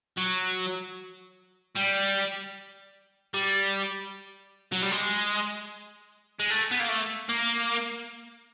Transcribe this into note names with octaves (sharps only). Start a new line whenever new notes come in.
F#3
G3
G3
F#3
G3
G#3
G#3
A3
B3
A#3
A3
A#3